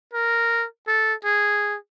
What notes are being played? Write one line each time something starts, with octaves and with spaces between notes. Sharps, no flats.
A#4
A4
G#4